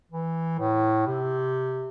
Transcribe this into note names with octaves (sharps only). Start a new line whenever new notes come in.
E3
A2
C3